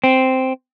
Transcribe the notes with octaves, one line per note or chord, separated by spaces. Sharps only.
C4